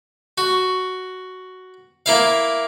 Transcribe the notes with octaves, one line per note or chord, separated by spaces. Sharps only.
F#4
A#3 E4 F5